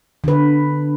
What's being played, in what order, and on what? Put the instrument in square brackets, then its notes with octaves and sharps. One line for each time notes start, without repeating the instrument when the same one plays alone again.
[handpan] D3 B4